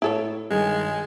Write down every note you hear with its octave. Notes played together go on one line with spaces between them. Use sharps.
A2 E4 A4 C#5
G2 D#3 G#3